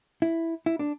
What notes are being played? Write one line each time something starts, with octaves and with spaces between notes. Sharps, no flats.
E4
E4
D4